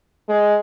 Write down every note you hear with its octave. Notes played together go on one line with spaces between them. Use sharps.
G#3